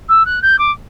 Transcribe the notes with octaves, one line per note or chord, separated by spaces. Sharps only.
E6
F#6
G6
D6